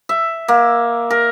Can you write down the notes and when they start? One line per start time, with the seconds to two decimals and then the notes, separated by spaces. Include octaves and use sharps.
0.09 E5
0.48 A#3
1.11 A#4